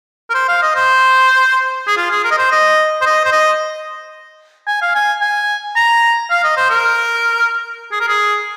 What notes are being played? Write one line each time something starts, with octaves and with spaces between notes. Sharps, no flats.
A#4
C5
F5
D#5
C5
G#4
F4
G#4
A#4
D#5
C5
D#5
C5
D#5
C5
D#5
G#5
F5
G#5
G#5
A#5
F5
D#5
C5
A#4
G#4
A#4
G#4